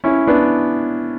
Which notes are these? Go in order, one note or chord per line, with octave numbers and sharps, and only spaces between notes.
C#4 E4
B3 D4